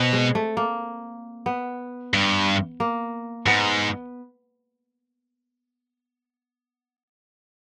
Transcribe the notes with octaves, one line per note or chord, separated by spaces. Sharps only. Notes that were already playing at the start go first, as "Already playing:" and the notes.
Already playing: B2 C4
G#3
A3
A#3
B3
G2
A#3
G#2 B3